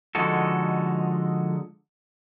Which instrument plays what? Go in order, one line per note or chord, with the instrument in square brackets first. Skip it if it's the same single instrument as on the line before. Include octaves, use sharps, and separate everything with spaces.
[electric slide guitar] D3 F3 G#3 D#4 F#4 A4